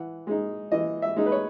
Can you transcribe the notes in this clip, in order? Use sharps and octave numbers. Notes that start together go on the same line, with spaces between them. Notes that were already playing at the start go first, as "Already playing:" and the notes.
Already playing: E3 F#5
G#3 D#4
E3 D#5
E5
G#3 D#4
B4
C#5